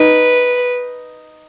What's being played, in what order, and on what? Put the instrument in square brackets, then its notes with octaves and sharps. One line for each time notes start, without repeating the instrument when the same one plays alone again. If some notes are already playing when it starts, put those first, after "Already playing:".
Already playing: [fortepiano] D#4 [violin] B4